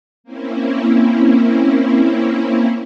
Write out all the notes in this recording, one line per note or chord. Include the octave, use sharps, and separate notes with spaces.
A#3 C4 C#4 E4